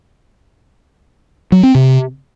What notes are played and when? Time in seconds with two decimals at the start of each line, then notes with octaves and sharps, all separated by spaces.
1.52 F#3
1.63 C4
1.75 C3